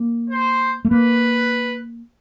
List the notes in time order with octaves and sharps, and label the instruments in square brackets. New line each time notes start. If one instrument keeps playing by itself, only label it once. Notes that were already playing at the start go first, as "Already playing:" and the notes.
Already playing: [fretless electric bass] A#3
[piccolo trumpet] C5
[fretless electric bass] A3
[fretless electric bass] A#3 [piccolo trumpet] B4